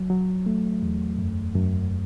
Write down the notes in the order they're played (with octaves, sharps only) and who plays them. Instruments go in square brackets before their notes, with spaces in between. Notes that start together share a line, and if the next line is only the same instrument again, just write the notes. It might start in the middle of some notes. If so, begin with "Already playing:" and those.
Already playing: [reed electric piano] F#3
F#3
A3
E2
F#2
F#2